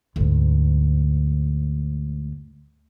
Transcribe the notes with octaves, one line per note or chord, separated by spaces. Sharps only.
D2 G#2